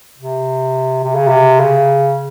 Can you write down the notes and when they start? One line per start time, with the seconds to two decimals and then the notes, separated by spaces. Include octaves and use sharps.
0.18 C3
1.04 C3
1.15 C#3
1.28 C3
1.60 C#3